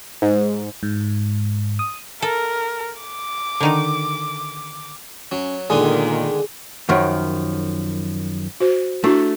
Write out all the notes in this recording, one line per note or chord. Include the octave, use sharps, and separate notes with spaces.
G#2
G#2
D#6
A4 A#4
D6
D3 D#3 D#4
F#3 C#4
A#2 D3 D#3 G#3 B3 G#4
F#2 D#3 F3
F#4 C5
A3 D4 E4 F#4